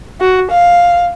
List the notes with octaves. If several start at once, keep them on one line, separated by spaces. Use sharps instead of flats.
F#4
F5